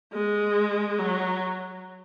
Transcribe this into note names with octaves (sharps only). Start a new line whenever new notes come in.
G#3
F#3